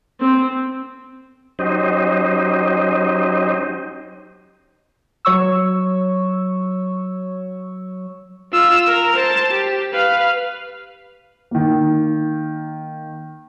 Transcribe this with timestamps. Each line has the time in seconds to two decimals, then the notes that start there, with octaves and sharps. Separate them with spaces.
0.21 C4
1.59 F#3 C#4 D#4 G4 C5 D#5
5.25 F#3 C#5 C#6 E6
8.53 F4 E6
8.88 A#4 A#5
9.16 C5 A5
9.51 G4
9.93 B4 F5
11.51 D#3 A#3